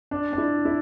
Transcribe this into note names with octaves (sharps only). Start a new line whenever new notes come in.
D4
D4
E4
E4